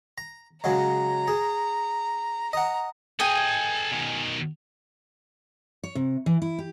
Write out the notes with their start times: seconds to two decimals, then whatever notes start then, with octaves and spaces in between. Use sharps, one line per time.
0.18 A#5
0.64 C#3 F#3 G#3 A#5
1.28 G#4
2.53 D#5 F#5 A#5
3.20 G#4 A4 D#5 G5 G#5
3.92 B2 D#3
5.84 C#5
5.95 C3
6.26 E3
6.42 E4
6.59 G4